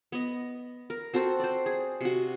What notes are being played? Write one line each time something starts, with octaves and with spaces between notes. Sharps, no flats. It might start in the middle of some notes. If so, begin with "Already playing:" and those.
B3 D#5
A#4
C4 F#4 A4 C5
C5 D5
G#4
C3 F#4